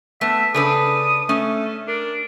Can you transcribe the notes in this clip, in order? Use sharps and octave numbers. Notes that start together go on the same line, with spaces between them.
A3 B3 E5
C#3 D4 A4 B4 D#6
A3 C#4
D4 A#4